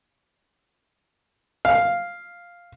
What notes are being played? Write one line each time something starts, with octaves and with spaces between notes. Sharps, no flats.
F5